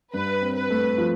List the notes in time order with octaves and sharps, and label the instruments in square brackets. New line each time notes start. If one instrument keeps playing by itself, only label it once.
[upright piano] G2 [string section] B4
[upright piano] C4
[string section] B4
[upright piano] A3
F3